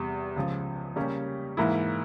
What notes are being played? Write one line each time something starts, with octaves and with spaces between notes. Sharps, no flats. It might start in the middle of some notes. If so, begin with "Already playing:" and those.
Already playing: E2 C3 G3
C#2 C#3 F3
C#3 G3 A#3 C#4 G4
G#2 E3 A#3 E4